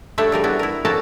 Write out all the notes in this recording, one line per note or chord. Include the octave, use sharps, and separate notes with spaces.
G3 A3 D4 C#5 E5
C#3 G3 A#4
B3 D4 E4 F#4
E4 A#4
A#3 C#4 F#4 A4 A#4 A5